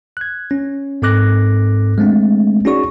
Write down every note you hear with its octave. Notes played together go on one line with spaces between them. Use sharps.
F#6 G#6
C#4
G#2 C4 A4 D6 F#6 A#6
G#3 A3 C4 D4
C#4 D#4 F#4 G#4 D5 C#6